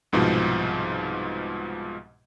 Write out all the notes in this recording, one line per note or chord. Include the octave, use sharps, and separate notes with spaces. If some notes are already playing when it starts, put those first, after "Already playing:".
C2 G#2 B2 F3